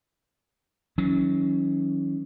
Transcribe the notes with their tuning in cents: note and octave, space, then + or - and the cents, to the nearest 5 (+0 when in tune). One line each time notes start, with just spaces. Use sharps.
D#3 +45 F#3 +0 C#4 +0